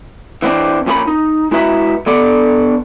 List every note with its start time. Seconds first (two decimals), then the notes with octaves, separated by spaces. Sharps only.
0.42 E3 B3 C4 D4
0.86 F2 A#2 C#4 E4 A#4 B5
1.07 D#4
1.51 G#3 E4 F#4 B4 E5 A#5
2.07 D3 B3 A4 D5